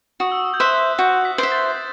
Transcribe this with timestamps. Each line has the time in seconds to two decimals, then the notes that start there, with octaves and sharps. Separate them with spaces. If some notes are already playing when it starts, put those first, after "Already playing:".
0.20 F#4 D#6
0.32 E6
0.44 D#6
0.54 G6
0.60 C5 E5 F#6
0.99 F#4 G6
1.25 B6
1.38 C5 E5
1.52 A6